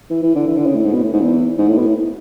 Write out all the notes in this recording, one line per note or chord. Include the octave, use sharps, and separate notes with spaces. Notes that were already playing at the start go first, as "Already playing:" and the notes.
E3
E3
D3
E3
D3
C#3
A2
G#2
B2
A2
G#2
E2
G#2
A2
B2
A2